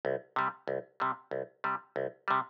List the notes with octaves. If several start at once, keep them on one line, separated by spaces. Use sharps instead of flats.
C2
C3 G3
C2
C3 G3
C2
C3 G3
C2
C3 G3